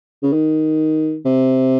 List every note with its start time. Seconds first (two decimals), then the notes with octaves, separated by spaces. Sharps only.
0.23 C#3
0.33 D#3
1.25 C3